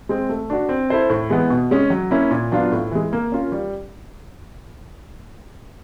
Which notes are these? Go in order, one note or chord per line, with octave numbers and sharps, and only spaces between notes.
G#3 C4
A3
D4 F#4
C4
E4 A4 C5
A2
E3 G#3 B3
B2
G#3 C#4
F#3
A#3 C#4 E4
A#2
F#3 B3 D4 F4
A2
E3 G#3
A#3
C#4 F4 A#4
G3